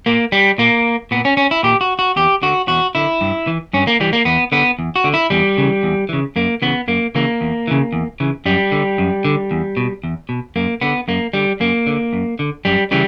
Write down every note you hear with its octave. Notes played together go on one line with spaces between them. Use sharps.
A#2 A#3
G3
A#2 A#3
A#2 B3
C#4
C#4
E4
A#2 G4
F#4
F#4
E2 G4
D3 F#4
E2 F#4
D3 E4
G2
E3
G2 C#4
A#3
E3 G3
A#3
E2 B3
D3 B3
E2
F#4
D3
E4
E2 G3
C#3 E3
E2
C#3 E3
F#2 A#3
C#3 E3 B3
F#2 A#3
C#3 E3 A#3
E2
C#3 E3
E2
C#3 E3
F#2 G3
D3
F#2
D3
E2
B2
E2
B2
F#2 A#3
D3 B3
F#2 A#3
D3 G3
F#2 A#3
D3
F#2
D3
F#2 G3
C#3 E3 G3